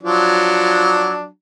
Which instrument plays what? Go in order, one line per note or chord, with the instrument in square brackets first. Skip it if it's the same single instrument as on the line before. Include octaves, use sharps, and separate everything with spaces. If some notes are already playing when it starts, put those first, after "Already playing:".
[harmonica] F3 F#3 D4